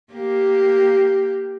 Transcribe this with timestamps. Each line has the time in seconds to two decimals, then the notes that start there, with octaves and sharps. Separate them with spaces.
0.14 A#3 G4